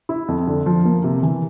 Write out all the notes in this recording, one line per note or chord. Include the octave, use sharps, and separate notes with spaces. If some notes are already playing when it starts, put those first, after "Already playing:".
E4
F2
D3
F3
A#3
C3
E3